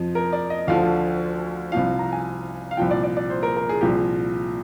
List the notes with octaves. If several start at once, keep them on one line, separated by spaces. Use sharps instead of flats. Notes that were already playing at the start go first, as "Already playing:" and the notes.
Already playing: F2 C3 F3
A#4
D5
D#5
D2 D3 F3 F5
C2 C3 F3 F5
A#5
G#5
F5
C2 A#2 F3 G5
D5
D5
D5
C5
A#4
A#4
G#4
C2 A#2 F3 G4
G#4